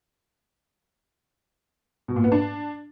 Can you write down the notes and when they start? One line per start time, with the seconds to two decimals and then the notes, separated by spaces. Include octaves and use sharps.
2.08 B2
2.16 A#2
2.24 B3
2.32 D4